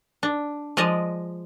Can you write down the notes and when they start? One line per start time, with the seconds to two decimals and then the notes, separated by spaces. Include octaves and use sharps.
0.23 D4
0.77 F3 G#3 D5 D#5